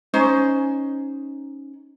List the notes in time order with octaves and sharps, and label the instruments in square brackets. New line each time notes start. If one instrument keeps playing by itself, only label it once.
[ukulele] C#4 D#4 C5